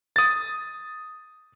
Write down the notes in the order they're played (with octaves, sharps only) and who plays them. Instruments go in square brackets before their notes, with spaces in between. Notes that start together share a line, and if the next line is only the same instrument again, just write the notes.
[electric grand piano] D#6 A6